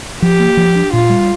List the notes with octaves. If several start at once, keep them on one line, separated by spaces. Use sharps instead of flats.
F3 G4
A#3
F3
D4
A#2 F4
G3